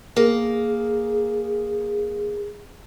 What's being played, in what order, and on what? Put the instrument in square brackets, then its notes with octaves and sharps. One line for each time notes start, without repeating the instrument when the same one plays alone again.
[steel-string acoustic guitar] A#3 [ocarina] G#4